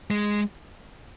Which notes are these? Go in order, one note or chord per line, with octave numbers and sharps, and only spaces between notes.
G#3